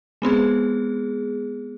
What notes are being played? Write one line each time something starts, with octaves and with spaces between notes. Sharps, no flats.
G#3 B3 C4 G#4